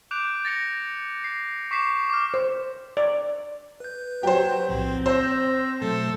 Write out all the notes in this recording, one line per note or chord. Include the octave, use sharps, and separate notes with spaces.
D6 F#6 G6 D7 F7
A6 A#6 C#7 F7
C7
C#6 D6 B6 C7 E7
D6 F6
C5
D5
B4 G6
F#3 G4 C5
B1 A2 F3 C4
C5 E6 G6 A#6
B2 F#3 A3 A4